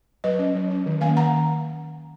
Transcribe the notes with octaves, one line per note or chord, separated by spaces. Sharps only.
F#3 B4 D#5
C#4
F#3
C#4
D#3
A#3 C#4 F5 G#5
D#3 F#5 A#5